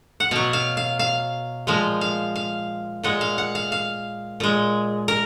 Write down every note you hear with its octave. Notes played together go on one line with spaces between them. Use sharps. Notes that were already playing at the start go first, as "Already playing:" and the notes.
F#5
B2 F#3 F5
F5
F5
F5
A#2 F3 G#3 F5
F5
F5
A#2 G#3 F#5
F5
F#5
F5
F5
A#2 G#3
A#4